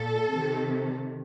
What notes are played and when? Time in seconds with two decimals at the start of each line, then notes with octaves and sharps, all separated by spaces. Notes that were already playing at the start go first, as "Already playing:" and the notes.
Already playing: A#2 A4
0.31 C3 D#3